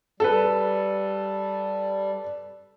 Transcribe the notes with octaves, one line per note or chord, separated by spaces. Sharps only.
G3 A4 B4